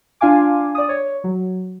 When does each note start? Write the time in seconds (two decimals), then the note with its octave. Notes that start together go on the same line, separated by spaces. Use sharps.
0.21 D4 F4 F5 G#5 D6
0.75 D5 D#6
0.89 C#5
1.24 F#3